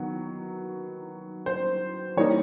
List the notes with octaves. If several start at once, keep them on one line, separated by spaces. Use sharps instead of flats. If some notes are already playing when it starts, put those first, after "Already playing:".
Already playing: D#3 F#3 B3
C5
E3 G3 A#3 D#4 C#5